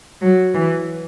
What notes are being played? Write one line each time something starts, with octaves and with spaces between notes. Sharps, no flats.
F#3
E3